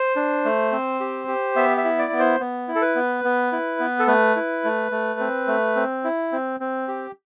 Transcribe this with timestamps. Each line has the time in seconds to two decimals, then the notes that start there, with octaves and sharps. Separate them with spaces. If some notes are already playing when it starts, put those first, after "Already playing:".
Already playing: C5
0.16 D4
0.45 A3
0.72 C4
1.00 G4
1.28 G4
1.56 B3 E5
1.77 E5
1.84 E4
1.99 D5
2.13 B3
2.19 C5
2.40 B3
2.68 E4
2.75 A4
2.82 B4
2.95 B3
3.24 B3
3.52 E4
3.80 B3
3.99 A4
4.07 A3 B4
4.36 E4
4.64 A3
4.91 A3
5.20 C4
5.48 A3
5.76 C4
6.04 E4
6.32 C4
6.60 C4
6.88 G4